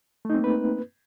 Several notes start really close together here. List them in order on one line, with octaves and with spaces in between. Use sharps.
A3 D#4 C4 A#3 B4